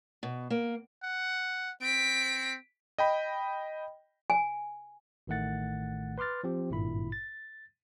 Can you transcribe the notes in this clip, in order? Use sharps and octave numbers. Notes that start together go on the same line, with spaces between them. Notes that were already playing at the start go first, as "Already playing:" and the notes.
B2
A#3
F#5
C4 B6 D7
D#5 G5 B5
G#5
A1 A2 D#3 A3 F#5 A6
B4 C6 D6 F6 A6
F3 C4 G4
G#1 G2 A#2 E4 B5
A6